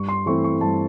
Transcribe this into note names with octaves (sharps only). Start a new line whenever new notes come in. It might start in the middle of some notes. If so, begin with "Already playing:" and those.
Already playing: G2 C#6
C6
E3 A3 C4 E4 C#6
C#6
G2 A5